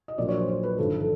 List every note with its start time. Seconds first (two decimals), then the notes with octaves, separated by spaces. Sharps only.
0.08 D#5
0.18 A#1 A#2 F#3 D5
0.28 C#5
0.38 C5
0.49 C5
0.63 B4
0.78 G#1 G2 D3 F3 A4
1.00 A4